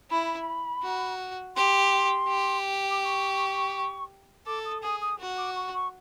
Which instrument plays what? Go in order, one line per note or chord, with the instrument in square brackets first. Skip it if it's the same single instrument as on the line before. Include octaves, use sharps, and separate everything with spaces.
[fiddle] E4 [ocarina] B5
[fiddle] F#4
[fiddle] G4 [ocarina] C6
[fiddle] G4
[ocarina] D6
D6
C#6
[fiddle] A4 [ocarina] D6
[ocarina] D#6
[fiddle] G#4 [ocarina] D#6
[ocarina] D#6
[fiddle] F#4
[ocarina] D6
C#6
C#6